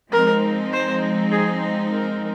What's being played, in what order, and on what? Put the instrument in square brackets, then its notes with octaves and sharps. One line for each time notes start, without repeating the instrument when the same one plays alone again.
[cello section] F3 G#3 C4 D#4 [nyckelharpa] A#4
[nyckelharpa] C5
G#4
A#4